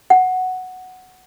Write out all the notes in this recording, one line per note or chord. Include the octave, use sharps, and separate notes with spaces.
F#5